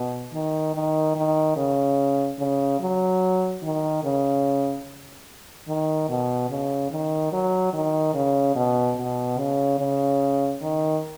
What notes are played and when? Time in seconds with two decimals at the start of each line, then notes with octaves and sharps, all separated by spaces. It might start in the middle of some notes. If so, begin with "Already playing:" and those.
Already playing: B2
0.34 D#3
0.75 D#3
1.16 D#3
1.56 C#3
2.39 C#3
2.81 F#3
3.63 D#3
4.04 C#3
5.68 D#3
6.09 B2
6.50 C#3
6.91 D#3
7.33 F#3
7.73 D#3
8.14 C#3
8.55 B2
8.97 B2
9.38 C#3
9.79 C#3
10.62 D#3